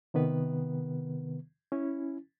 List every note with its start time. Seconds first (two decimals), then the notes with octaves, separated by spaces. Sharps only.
0.14 C3 D#3 B3 B4
1.72 C#4 E4